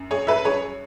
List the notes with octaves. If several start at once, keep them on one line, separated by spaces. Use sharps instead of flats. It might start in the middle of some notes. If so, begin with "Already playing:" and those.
Already playing: F#2
G#4 C#5
B4 E5
G#4 C#5